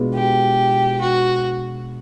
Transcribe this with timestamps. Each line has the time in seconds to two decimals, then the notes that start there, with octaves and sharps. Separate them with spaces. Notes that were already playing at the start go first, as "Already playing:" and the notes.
Already playing: B2 G#3 B3 D4 F4
0.14 G4
1.01 F#4